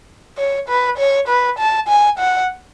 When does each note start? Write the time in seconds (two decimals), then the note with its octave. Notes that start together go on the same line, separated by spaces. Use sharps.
0.38 C#5
0.68 B4
0.98 C#5
1.28 B4
1.59 A5
1.88 G#5
2.19 F#5